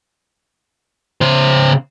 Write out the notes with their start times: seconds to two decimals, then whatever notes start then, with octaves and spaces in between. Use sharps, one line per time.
1.21 C#3 C5